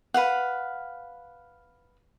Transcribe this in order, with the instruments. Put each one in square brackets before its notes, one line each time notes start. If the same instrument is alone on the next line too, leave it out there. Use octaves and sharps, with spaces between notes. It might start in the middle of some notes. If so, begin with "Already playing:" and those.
[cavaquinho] B4 F5 F#5